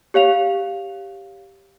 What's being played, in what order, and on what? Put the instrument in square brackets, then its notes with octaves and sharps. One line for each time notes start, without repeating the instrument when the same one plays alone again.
[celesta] G4 C#5 F5 F7